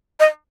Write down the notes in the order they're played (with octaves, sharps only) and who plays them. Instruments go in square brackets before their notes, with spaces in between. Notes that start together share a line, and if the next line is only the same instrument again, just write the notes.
[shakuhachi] D#5